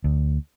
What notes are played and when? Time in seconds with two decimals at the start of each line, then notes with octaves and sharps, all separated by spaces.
0.04 D2